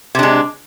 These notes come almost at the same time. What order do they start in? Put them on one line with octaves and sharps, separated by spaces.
C3 D4 G#3